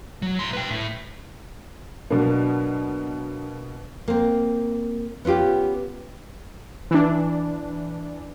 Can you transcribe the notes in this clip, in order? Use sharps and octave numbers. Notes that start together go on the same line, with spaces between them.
F#3
A2 C6
B4 G5
A2
B2 F#3 A#3 B3 D4
A#3 C4
B3 C#4 F4 G4
E3 D4